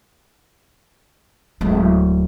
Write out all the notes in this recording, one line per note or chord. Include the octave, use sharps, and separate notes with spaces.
D1 G#3